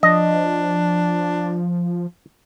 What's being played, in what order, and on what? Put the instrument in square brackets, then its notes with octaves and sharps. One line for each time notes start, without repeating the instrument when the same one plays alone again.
[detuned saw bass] F3 [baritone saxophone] D4 [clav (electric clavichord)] D#5